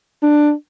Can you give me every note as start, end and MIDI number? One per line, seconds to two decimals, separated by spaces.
0.23 0.52 62